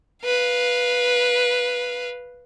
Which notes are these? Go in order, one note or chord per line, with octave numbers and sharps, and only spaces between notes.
B4 F5